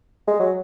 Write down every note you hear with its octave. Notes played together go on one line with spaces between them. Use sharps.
G#3
F#3